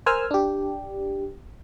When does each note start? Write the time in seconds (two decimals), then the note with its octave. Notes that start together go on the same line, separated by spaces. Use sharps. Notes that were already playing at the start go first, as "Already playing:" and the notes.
0.06 A#4 C5 G#5 E6 F6
0.31 D4 G4